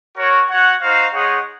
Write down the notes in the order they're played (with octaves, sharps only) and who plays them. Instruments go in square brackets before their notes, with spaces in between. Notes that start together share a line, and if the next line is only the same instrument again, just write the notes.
[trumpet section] F#4 A#4 C#5
F#4 C#5 F#5
D#4 F#4 C5 F5
G#3 D#4 G#4 C#5 F#5